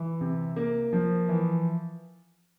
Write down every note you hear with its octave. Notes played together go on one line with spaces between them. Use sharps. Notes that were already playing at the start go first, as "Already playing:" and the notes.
Already playing: E3
C3
A#3
F3
E3